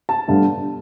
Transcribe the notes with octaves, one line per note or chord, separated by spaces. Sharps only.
A5
G1 G2 D3